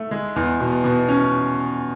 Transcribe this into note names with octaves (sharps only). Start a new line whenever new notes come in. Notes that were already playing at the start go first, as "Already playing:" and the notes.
Already playing: A3
G#3
E2
B2
B2
C#4